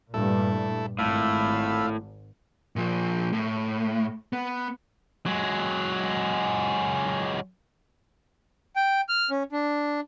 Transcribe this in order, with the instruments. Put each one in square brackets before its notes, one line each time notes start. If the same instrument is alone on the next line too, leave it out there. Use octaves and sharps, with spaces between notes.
[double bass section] G2 A#2 [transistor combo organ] A3 E4 A4
[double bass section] G#1 [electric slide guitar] A2 [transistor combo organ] F4 E5 F5 [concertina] A4 B5 E6
[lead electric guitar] A#2 F3
A2
B3
F#3 G#3
[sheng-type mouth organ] G5
F6
C#4
D4